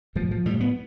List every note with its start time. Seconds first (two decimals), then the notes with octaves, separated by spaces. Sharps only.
0.15 A2 F3
0.31 F3
0.46 A2 G3
0.61 B3